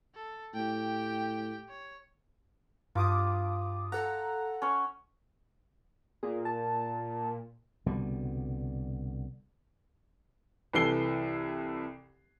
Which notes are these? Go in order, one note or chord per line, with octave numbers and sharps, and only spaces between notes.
A4
A2 G4 G5
C#5
G2 F4 D6 D#6
A4 F#5 A#5
C#4 C#6
A#2 G#4
A5
C2 B2 D3 G3
C2 E3 A4 C7 G7